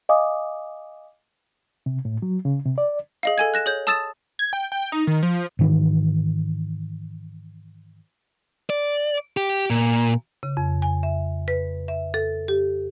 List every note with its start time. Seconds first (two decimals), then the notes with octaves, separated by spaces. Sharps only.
0.09 D#5 F5 G#5 D6 D#6
1.86 C3
2.05 A2
2.22 F#3
2.45 C#3
2.66 C3
2.78 D5
3.23 G#4 D#5 F5
3.38 A4 G#5 G#6
3.54 F#6 A#6 E7
3.66 G#4 C#5 G6
3.87 A5 D#6 E6 A6 E7
4.39 G#6
4.53 G5
4.72 G5
4.92 D#4
5.07 D#3
5.23 F3
5.59 G#2 D#3 E3
8.70 D5
9.37 G4
9.70 A#2
10.43 C#3
10.57 F2
10.82 G#5
11.03 E5
11.48 B4
11.88 E5
12.14 A4
12.48 G4